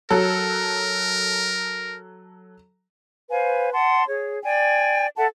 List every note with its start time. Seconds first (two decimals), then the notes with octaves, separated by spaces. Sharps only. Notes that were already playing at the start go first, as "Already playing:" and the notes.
0.10 F#3 A4 A#4
3.30 B4 C5 F5 G#5
3.72 F#5 A5 C6
4.08 G#4 C#5
4.44 D5 G5 G#5
5.17 A4 E5 F#5 A5